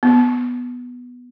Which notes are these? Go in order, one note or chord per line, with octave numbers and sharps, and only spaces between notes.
B3